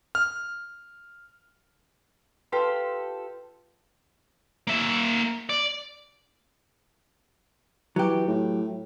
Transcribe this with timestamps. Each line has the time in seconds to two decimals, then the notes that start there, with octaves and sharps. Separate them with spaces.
0.15 F6
2.52 F4 G4 A4 B4 C6
4.67 A#3 E5
5.49 D5
7.96 E3 F#3 G4
8.27 A2